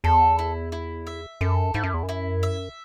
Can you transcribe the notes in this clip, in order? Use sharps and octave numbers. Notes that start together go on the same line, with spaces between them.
E2 A4
E4
E4
E5
F#2 A4
G#2 E4
F#2
E2
F#2
E4
E5